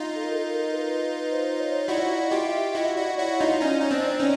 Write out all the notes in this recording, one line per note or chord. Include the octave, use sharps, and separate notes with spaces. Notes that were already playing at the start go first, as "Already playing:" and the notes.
Already playing: D#4 F4
A4
A#4
A4
A#4
B4
B4
C5
C#5
E4 F#4 D5
D#5
F4 G4
E5
E4 F#4 D#5
E4 F#4 D5
E4 F#4 C#5
D#4 F4 D#5
C#4 D#4 D5
D#4
C4 D4
C#4 D#4